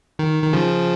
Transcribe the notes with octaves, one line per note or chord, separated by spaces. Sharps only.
D#3
D#3
C#3 F3